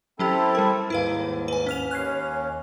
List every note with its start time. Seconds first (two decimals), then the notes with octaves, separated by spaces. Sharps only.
0.19 F#3 C4 C#4 E4 G4 A4
0.55 G3 A#4
0.90 D#2 G#2 E4 B4 F5
1.48 B4 G#5
1.67 C#4 F6 F7
1.91 D#2 C#4 F#6 G#6 C7